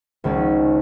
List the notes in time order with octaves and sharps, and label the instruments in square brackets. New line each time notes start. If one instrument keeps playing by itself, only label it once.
[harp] G#1 C#2 C#4